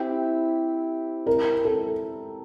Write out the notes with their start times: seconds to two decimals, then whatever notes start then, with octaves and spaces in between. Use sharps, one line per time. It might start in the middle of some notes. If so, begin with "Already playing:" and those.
Already playing: C4 E4 G4
1.27 A#4
1.65 A4